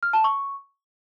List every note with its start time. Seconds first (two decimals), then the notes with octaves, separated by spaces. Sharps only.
0.03 F6
0.13 A5
0.24 C#6